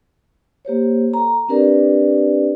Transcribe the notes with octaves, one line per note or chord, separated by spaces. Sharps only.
A#3 G4 C5 C#5
A4 A#5
C4 D4 G4 A#4 B4 D5